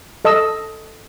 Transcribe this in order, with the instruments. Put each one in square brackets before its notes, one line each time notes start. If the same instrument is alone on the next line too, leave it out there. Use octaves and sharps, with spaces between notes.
[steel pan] A4 D#5 A5 E6